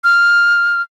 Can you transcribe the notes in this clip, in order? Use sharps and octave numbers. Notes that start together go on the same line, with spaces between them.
F6